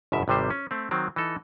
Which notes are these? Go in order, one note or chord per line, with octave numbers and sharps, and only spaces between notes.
G1 F#2 B2 E5
G#1 C3 G3 C5
C#4
A3 C4
D#3 F#3 C4
E3 D#4 A4